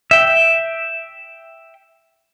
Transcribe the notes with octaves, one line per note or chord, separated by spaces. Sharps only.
E5 G5